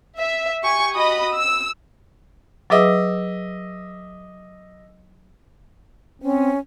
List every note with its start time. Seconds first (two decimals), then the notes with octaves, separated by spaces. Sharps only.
0.19 E5
0.63 G4 G#5 C#6
0.95 F#4 D#5 B5 D#6
1.36 E6
2.70 F#3 G#4 B4 D#5 E5 D6
6.22 C4 C#4